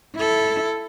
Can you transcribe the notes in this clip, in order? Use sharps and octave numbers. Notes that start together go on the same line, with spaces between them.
E4 A4